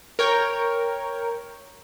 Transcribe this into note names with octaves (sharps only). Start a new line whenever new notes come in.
A#4 C#5 G5